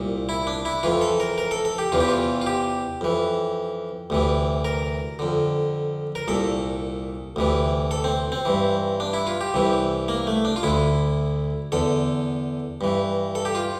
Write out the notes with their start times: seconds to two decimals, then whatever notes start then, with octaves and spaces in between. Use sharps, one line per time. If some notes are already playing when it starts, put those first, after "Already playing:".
Already playing: C2 A#2
0.29 E4
0.47 D4
0.65 E4
0.83 F2 E3 F4
1.01 A4
1.20 A#4
1.38 A#4
1.51 A4
1.65 A4
1.78 G4
1.92 E2 C3 E3 F4
2.00 G4
2.09 F4
2.42 F4
2.47 G4
3.01 F2 E3
4.10 D2 C3 E3
4.65 A#4
5.19 F2 D3
6.15 A#4
6.28 C2 A#2 A4
7.36 D2 C3 E3
7.91 A4
8.04 C4
8.32 C4
8.45 G2 E3
9.00 D4
9.13 E4
9.27 F4
9.41 G4
9.54 C2 C3 E3
10.08 A#3
10.27 A3
10.45 D4
10.56 F4
10.63 D2 D3 E4
11.72 E2 D3 A4
12.81 G2 E3
13.35 A4
13.45 G4
13.55 F4